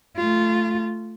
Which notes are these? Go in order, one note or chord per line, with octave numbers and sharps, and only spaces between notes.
A3 F4